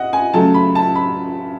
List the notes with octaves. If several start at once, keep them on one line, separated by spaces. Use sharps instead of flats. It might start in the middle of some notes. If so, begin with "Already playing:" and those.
Already playing: D#5 F#5
G#5
C#3 F#3 A3 A5
B5
A5
B5